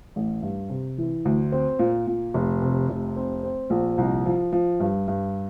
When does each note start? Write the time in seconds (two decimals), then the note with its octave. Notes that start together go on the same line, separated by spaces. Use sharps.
0.16 A1
0.42 G2
0.70 C3
0.98 E3
1.25 D2
1.52 C4
1.79 A#2
2.07 A#2
2.34 F1
2.62 C3
2.89 F1
3.16 C4
3.43 C4
3.70 A#1
3.98 C2
4.26 F3
4.52 F3
4.80 G2
5.08 G2